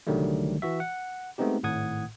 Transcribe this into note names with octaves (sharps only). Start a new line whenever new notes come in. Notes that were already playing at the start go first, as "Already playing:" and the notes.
C2 D3 D#3 F#3 G3 A3
E3 F#4 E5
F#5
G#3 A3 B3 C4 D#4 G4
G#1 A2 F#5 D#6 G#6